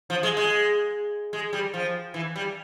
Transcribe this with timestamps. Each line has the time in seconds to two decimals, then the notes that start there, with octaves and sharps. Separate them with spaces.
0.10 F3
0.23 G#3
0.37 G#3
1.33 G#3
1.53 G3
1.74 F3
2.14 E3
2.36 G3